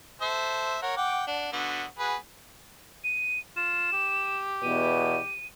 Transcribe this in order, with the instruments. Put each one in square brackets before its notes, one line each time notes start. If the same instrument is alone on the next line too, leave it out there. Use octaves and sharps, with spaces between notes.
[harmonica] A4 C5 E5
A#4 C#5 F#5
F#5 G5 D6
D4 F#5
D3 B3 F#4
F#4 G#4 B4
[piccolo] D#7
[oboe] F4 [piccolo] E7
[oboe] G4
[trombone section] E2 B2 [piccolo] D#7